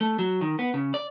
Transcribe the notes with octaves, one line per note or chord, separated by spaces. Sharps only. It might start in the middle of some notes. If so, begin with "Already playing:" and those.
A3
F#3
D#3
B3
C#3
D5